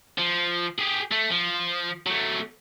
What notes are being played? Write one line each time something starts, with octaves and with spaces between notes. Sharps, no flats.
F3
G4 G#4
A3
F3
F#3 A3